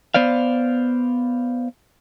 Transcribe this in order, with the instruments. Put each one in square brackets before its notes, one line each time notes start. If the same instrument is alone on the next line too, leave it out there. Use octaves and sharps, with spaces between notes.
[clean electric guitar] B3 C5 D5 F5